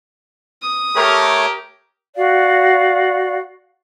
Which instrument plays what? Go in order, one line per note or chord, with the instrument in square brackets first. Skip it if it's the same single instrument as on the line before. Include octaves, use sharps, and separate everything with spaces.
[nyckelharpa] D#6
[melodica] A3 A4 C#5 [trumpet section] G4 A#4
[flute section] F#4 D5 F5